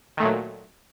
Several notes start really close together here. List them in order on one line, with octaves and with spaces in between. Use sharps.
D#3 A3 A#2 F#3